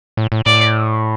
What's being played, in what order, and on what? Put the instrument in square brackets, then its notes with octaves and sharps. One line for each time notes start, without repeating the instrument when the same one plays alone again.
[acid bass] A2
A2
[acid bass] A2 [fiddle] D5